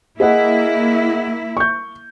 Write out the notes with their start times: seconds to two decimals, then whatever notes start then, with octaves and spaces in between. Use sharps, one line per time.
0.20 A#3 E4 G#4 D#5 F#5
1.57 C#6 G6